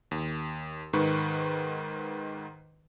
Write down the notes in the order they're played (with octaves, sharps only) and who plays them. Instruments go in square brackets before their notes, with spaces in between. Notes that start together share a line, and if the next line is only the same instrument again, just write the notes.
[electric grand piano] D#2
G#2 D#3 B4 C#6